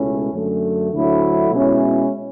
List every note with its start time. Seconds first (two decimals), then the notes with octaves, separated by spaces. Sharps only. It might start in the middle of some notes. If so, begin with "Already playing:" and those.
Already playing: C#2 B2 A3 C#4 E4
0.32 F#2 D3 A3
0.92 D2 D3 F#3 A3 E4
1.51 B2 G#3 C#4 E4